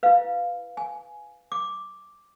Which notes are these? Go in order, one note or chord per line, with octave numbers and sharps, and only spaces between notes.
E4 B4 F5
G#5
D6